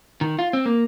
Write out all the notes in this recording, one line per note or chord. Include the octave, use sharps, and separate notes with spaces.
D#3
F4
C4
A#3